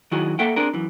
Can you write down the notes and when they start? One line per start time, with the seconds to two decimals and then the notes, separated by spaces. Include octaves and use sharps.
0.11 D#3 F#3 E4 F#4 G#4
0.39 A#3 A4 E5 F#5 G5
0.56 C4 D4 G#4 A#4
0.74 F#2 E3